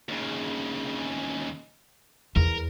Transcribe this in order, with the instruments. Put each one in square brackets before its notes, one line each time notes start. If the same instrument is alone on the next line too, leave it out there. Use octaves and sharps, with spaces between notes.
[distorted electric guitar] D#2 C#3
[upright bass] E2 [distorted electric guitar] A#4